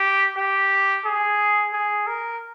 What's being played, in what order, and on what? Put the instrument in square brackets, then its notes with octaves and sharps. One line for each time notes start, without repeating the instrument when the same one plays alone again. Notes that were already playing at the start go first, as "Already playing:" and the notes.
Already playing: [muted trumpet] G4
G4
G#4
G#4
A#4